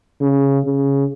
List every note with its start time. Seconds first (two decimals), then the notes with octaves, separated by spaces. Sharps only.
0.20 C#3
0.65 C#3